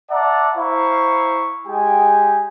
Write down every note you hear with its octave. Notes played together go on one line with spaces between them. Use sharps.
D5 E5 F#5 A5 A#5
E4 C5 F5 A#5 C#6
G#3 G4 G5 G#5